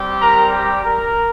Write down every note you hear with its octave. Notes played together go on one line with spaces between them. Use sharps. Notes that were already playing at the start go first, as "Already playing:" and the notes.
Already playing: G3 C4 G4
A#4 A#5
G4 G5
A#4 A#5